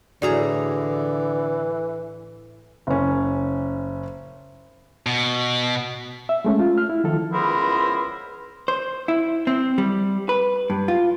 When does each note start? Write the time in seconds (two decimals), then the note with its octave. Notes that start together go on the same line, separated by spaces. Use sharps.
0.22 A2 D3 E3 F#4 G#4 D5 A#5
2.87 F#1 C#4
5.06 B2
6.29 E5
6.45 G#3 A3 C#4
6.59 F4
6.78 F6
6.90 E4
7.04 D#3 F3 A4
7.33 C#2 B3 E4 A#4 C5
8.68 C5
9.08 E4
9.47 C4
9.78 G3
10.29 B4
10.70 G2
10.88 F4